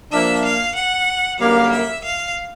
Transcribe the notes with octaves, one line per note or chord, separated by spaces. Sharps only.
F3 A#3 D4 E5
F5
F#5
F#2 D3 G3 A#3 F5
E5
F5